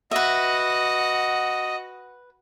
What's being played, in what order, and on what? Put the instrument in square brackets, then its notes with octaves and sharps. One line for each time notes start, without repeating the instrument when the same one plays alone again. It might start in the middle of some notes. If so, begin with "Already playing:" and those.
[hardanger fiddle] F#4 F#5 [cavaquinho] B4 E5 [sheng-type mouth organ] D#5